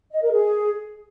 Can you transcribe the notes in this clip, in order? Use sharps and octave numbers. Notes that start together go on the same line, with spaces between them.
D#5
A#4
G#4